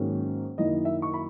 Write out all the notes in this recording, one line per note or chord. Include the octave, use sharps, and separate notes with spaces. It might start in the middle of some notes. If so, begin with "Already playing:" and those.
Already playing: G#2 D#3 F#3 A#3 C#4
F#2 D#3 A#3 E4 D#5
E5
C#6
B5